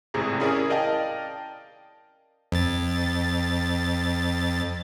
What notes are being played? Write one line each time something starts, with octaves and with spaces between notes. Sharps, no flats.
G#1 A2 C3 G#4 A#5
C#4 E4 G#4 A#4 D5
A#4 D5 D#5 F5 G5 A5
F2 A6